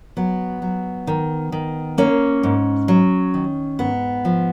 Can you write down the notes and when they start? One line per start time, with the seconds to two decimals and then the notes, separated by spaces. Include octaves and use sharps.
0.17 F#3 B3
0.62 F#3
1.07 D#3
1.52 D#3
1.98 A#3 C#4
2.43 G#2
2.88 F#3
3.34 D#3
3.79 G#2 B3
4.25 F3